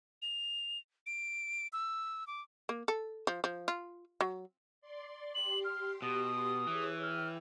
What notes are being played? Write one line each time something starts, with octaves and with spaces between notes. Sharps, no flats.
F7
D7
E6
D6
A#3
A4
F3
F3
F4
F#3
D5 C6
G4 C6 F#7
F6
B2 D#6
E3 G#4 C#5
G5 F6